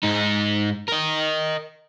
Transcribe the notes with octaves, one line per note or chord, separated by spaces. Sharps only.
G#2 D#4
A#4 D#5